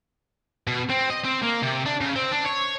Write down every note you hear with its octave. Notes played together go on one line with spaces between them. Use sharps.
B2
C4
D#5
C4
A#3
C3
D4
C#3
C4
D4
C#5